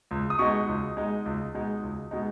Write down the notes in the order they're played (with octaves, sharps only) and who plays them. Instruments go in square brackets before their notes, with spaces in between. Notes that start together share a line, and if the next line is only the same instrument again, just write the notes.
[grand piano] C#2
D#6
B2 G#3 D#4 C#6
C#2
B2 G#3 D#4
C#2
B2 G#3 D#4
C#2
B2 G#3 D#4